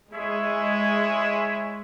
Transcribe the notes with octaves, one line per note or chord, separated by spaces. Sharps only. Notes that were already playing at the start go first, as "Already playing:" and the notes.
G#3 E4 G#4 C#5 E5